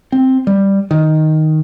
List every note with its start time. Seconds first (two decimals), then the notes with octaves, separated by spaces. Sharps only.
0.12 C4
0.47 G3
0.91 D#3